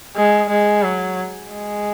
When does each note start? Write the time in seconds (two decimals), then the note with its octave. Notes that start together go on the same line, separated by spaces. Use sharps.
0.16 G#3
0.49 G#3
0.83 F#3
1.51 G#3